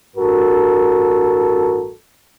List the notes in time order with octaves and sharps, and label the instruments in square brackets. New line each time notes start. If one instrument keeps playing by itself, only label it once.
[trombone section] A1 G2 F#4 A4 A#4